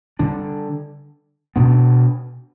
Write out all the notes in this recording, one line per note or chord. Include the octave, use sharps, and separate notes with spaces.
D3 G3 D4
B2 B3 D4